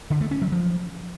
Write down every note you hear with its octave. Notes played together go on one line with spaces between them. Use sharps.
D3
A3
C#4
F#3
F3